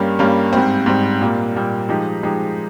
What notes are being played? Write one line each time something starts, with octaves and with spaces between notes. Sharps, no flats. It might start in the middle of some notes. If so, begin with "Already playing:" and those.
Already playing: G2 G3 A#3 C#4
G2 G3 A#3 C#4
G#2 G3 C4
G#2 G3 C4
A#2 G3 A#3
A#2 G3 A#3
F3 G#3 D#4 G4
F3 G#3 D#4 G4